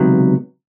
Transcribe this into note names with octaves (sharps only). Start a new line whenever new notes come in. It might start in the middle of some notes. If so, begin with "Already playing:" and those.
Already playing: C#2 C3 D#3 F#3 B3